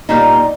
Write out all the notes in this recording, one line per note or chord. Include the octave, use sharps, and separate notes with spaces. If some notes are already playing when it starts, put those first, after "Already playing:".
A#2 G3 A#3 D#4